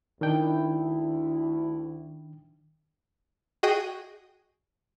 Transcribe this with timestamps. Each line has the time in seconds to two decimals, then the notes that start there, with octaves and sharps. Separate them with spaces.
0.21 D2 D#3 D4 E4 G5
3.63 F#4 G#4 D#5 G5 D#6